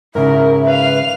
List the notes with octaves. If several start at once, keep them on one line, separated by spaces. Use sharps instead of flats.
G#2 C#3 E4 A#4 E5
B4 F5 F7